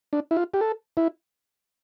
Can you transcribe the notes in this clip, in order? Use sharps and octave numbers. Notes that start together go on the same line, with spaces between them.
D4
E4
F4
G4
A4
E4